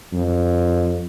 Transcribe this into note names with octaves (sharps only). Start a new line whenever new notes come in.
F2